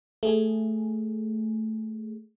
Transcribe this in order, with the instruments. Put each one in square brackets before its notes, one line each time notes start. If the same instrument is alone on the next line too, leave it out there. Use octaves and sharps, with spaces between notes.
[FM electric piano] A3 G#4